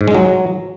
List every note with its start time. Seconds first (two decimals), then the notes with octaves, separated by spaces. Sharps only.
0.01 G#2
0.08 G#3
0.14 F#3